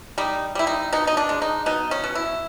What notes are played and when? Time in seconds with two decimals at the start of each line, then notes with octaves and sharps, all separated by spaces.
0.18 G3 D#4
0.55 G3 E4
0.67 D#4
0.93 B2 D#4
1.07 D#4
1.17 D4
1.29 G#3
1.42 D#4
1.66 B2 D#4
1.91 C#4
2.04 B2
2.15 E4